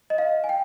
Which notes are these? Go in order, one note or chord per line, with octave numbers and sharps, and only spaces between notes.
D#5
F5
G#5
G5